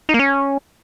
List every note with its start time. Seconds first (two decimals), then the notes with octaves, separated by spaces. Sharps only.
0.09 D#4
0.14 A#3
0.19 C#4